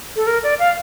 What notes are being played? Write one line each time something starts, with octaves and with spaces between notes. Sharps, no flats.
A4
A#4
D5
F5